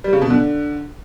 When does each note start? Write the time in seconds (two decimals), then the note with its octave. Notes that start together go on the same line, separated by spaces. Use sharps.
0.04 G3
0.13 C#3
0.21 B2
0.30 D3